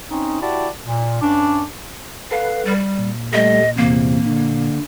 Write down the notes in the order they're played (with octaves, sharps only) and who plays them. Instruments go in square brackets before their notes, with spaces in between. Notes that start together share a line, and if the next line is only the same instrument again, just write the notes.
[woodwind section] C4 C#4 D#4
E4 F#4 G4 D5 A5
A#2
G2 C#4 D4
[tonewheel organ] A4 B4 F#5 [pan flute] F5
[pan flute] G3
[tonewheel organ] A#2
[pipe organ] G3 A3 [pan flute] D#5
[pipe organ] E2 C3 [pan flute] A#3
[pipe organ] D3